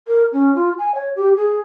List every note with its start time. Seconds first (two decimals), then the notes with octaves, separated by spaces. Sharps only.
0.07 A#4
0.32 C#4
0.55 F4
0.78 G#5
0.95 C#5
1.16 G4
1.36 G#4